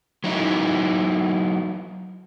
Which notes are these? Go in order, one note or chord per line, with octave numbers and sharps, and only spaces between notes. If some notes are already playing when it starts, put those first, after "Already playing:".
F#3 D#4 E4